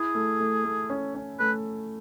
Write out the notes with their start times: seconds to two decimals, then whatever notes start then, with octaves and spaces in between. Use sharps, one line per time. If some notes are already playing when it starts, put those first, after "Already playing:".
Already playing: E4 G#4
0.15 A3
0.40 A3
0.64 A3
0.90 C#4
1.15 C#4
1.40 A3 B4